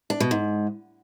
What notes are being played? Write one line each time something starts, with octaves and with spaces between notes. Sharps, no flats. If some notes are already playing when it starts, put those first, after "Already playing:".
D4
B2
G#2